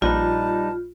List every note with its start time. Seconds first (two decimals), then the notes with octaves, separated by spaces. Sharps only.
0.02 A#1 G3 D#4 F4 B4 A5